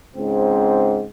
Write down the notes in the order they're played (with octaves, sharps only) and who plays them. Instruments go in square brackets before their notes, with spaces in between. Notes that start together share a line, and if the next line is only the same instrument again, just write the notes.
[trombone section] C#2 G#2 C4